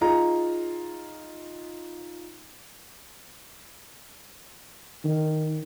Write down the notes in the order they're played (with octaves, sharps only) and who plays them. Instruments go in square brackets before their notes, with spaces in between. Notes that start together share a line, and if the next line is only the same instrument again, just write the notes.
[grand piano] D#4 F4 G#4 A#5
[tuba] D#3